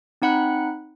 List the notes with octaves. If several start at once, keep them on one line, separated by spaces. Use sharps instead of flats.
C4 D#4 F#5 B5 F#6